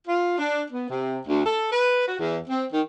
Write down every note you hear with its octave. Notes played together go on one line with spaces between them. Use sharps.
F4
D4
B3
C3
D2
A4
B4
F#4
E2
C4
D#3